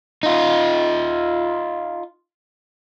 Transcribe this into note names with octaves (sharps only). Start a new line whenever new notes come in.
D#4 F4